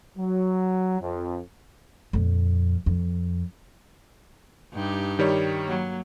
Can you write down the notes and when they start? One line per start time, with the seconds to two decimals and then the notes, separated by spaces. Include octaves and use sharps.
0.17 F#3
1.01 F2
2.13 F2 A#2
2.86 F2
4.74 G2 D#4 G4
5.19 D#3 G3 C#5
5.68 F#3 A#3